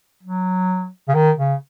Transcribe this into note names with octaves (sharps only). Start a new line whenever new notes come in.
F#3
C#3
D#3
C#3